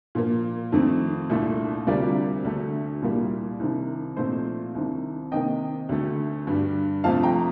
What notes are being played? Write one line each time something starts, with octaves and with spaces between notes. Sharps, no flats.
A#2 F3 A#3
F2 D#3 A3 C4
C2 A#2 A3 D4
D2 C3 G3 D4 F4 A#4 D5
D2 D3 A3 D4
C2 A#2 G3 A#3
C2 C3 D#3
A#2 F3 A3 C4 D#4 C5
C2 C3 D#3
C3 D#3 A#3 D#5 G5
D2 D3 A3
G2 D3 G3
F2 C3 F3 A3 F5 A5
G5 A#5